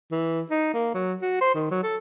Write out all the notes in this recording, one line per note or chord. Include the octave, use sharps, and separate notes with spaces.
E3
D#4
A#3
F#3
F#4
C5
D#3
F#3
A4